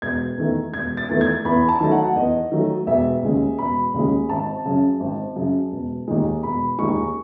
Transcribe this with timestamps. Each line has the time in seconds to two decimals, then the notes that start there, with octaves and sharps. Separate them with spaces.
0.02 E1 G#6
0.38 E2 D#3 A3
0.74 E1 G#6
0.97 A6
1.09 E2 D#3 A3
1.21 G#6
1.45 E2 B5
1.69 A5
1.80 D#3 F#3 A3
1.91 F#5
2.15 E2 D#5
2.52 D#3 F#3 A3
2.87 E1 E5
3.22 D#2 C#3 G#3
3.58 E1 B5
3.94 D#2 C#3 G#3
4.29 G#1 A5
4.65 F#2 C#3
5.00 G#1
5.36 F#2 C#3
5.72 E1
6.08 D#2 D#3 G#3
6.43 E1 B5
6.78 D#2 D#3 G#3 C#6